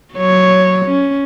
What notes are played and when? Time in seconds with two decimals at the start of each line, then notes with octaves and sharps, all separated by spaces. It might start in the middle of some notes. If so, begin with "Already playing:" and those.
0.14 F#3 C#5
0.85 C#4